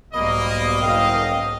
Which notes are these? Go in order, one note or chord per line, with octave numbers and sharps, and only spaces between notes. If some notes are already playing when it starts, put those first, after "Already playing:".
B1 G#2 B2 G3 A#3 D#5 B5
F#1 F5 G5